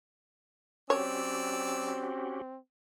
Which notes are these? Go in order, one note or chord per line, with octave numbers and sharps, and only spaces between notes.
F#3 C4 C#4 F#4 G4 C#5 D5 E6